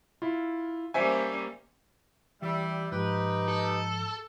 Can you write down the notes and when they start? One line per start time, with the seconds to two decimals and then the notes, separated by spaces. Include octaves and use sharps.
0.22 E4 F4
0.94 G3 A#3 C#4 C5 E5 G#5
2.42 E3 G3 E5
2.92 G#2 F3 D#4 G4 B4
3.48 A4